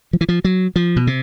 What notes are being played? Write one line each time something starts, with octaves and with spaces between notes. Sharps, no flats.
F3
E3
F3
F#3
F3
B2
C3